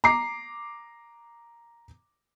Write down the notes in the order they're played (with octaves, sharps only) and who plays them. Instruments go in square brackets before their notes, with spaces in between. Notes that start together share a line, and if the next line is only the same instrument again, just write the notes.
[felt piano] A#5 D6 C7